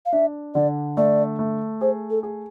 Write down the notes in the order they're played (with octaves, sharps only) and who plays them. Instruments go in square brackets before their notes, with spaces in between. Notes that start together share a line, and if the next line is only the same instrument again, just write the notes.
[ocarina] F5
[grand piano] D4 [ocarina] E5
[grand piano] D3 [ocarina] D5
[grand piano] A3 [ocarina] D5
[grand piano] A3
[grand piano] G#4 [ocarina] C5
[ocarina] A4
[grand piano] G#4